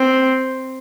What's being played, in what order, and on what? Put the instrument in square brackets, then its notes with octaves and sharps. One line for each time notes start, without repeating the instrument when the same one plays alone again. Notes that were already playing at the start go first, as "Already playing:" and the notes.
Already playing: [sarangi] C4